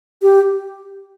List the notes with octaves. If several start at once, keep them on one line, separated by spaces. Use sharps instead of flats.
G4